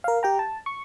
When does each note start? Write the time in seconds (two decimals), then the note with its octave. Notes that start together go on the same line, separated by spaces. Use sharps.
0.04 A#4 F5
0.23 G4 G5 A#5
0.39 A5
0.66 C#6